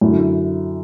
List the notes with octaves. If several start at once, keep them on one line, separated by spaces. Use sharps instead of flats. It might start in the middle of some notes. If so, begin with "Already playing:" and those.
F#2 D3 E4